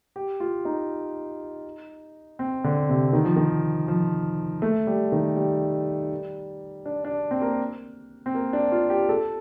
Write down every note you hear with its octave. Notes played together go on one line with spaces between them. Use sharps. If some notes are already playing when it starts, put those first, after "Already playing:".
G4
F4
D#4
C4
D3
C3
D#3
F3
D#3
F3
A3
G3
D#3
G3
D4
D4
C4
A#3
C4
A#3
D4
F4
G4
A4